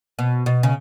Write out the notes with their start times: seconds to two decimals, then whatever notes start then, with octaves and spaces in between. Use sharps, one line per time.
0.19 B2
0.46 B2
0.63 C#3